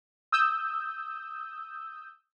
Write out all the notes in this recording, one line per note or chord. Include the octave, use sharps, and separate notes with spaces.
D#6 E6 G6